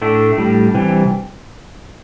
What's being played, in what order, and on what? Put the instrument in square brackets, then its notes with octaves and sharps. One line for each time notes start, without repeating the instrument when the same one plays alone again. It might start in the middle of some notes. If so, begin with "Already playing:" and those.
[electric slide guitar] A2 A3 D4
A2 G3
C3 E3 G3